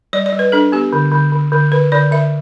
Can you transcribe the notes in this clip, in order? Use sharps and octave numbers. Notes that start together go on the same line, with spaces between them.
G3 D5
D5
G3
B4
D4 A4
B3 G4
D3
D3
D3
D3
D3 B4
D3 D5
D3 E5